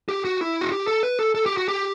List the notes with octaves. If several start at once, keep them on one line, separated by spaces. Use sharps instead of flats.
G4
F#4
E4
F#4
G4
A4
B4
A4
A4
G4
F#4
G4